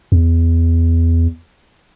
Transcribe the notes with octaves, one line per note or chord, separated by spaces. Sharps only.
E2